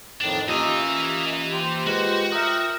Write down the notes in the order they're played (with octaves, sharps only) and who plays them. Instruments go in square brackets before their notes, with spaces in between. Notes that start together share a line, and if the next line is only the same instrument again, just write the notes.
[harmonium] F2 A2 D#3 [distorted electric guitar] D4
[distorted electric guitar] E3 G#5 [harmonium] A#3 D#5 E5 [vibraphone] C#4 G4 [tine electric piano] F4
[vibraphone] A#3 C6 [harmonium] G4 C5
[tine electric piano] G#3 B4 [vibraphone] F4 [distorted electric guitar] F#4
[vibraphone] F4 [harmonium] A#4 G5 [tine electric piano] E5 D#6